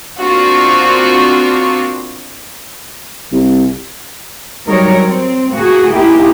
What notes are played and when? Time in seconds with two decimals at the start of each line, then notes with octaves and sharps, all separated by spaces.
0.20 A#3 C4 D4 F4 F#4
3.31 C2
4.68 F#3 G3 D#4 A#4 C#5
5.01 C4
5.56 A#3 F#4 G#4
5.91 A#3 D#4 E4 G4 G#4